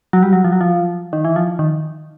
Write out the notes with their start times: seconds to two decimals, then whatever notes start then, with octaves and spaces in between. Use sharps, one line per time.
0.13 F#3
0.23 G3
0.33 F#3
0.44 F3
0.52 F#3
0.61 F3
1.13 D#3
1.25 E3
1.36 F3
1.59 D#3